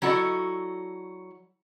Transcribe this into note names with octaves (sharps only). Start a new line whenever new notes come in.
F#3 E4 F#4 A4 D5 D#5